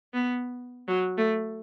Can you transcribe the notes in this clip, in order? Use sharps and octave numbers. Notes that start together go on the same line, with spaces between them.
B3
F#3
A3